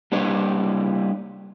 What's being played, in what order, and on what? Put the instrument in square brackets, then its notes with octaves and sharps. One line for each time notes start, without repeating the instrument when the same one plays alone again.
[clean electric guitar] G3 A#3 D4 C#5